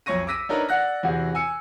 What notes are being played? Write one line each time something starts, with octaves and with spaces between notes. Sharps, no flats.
B1 F2 C#5 C#6 A#6 D#7
D6 E6 A#6 B6 D#7
D4 D#4 A#4 B4 C#5
D5 F#5 F#6 A#6
E2 C3 F#4 G#4
G#5 E6 C#7